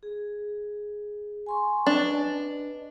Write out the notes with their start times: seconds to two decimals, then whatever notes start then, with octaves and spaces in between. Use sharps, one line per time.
0.03 G#4
1.46 G#5 C6 C#6
1.87 D4 B4 D#5